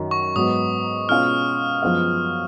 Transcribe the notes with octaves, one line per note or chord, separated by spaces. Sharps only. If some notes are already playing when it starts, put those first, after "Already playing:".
Already playing: F#2 D#3 F#3
C#6
G#2 F#3 B3 D#6
B2 G#3 C#4 F4 F6
F#2 F3 G#3 B3 F4